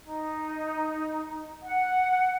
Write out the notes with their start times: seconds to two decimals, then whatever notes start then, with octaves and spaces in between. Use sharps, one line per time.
0.01 D#4
1.64 F#5